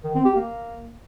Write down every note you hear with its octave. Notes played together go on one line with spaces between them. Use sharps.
D#3
C4
G4
A#3